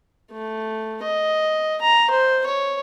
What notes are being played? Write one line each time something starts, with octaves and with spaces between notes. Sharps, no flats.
A3
D#5
A#5
C5
C#5